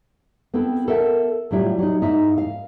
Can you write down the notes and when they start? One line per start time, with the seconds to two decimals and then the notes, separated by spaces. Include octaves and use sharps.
0.54 B3 C4 E4 A4
0.88 A4 A#4 E5 F#5
1.51 A2 F#3 G3 E4 F4
1.78 F#3 D#4
2.02 G#2 D#4 E4 E5
2.38 F5